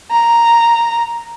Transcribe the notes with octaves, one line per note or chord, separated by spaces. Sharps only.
A#5